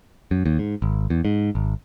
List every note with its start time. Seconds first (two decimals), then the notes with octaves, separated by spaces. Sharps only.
0.31 F#2
0.46 D#2
0.59 G#2
0.82 G#1
1.10 E2
1.25 G#2
1.55 G#1